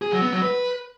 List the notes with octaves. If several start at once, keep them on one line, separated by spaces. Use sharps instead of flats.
G#4
F#3
B3
F#3
B4